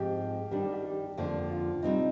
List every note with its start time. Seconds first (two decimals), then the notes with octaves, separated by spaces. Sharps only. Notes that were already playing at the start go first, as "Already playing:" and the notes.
Already playing: G#2 F3 G#3 C4 G4
0.51 D#3 G3 D4 G4
0.62 G4
0.73 G4
0.85 G4
1.17 F2 D3 F3 A#3 D4
1.51 F4
1.83 C3 G3 C4 D#4